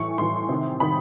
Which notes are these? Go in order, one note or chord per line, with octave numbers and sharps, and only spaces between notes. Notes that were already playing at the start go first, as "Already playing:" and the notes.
Already playing: A2 E3 C#6
A2 E3 C6
C3 D#3
C3 D#3 B5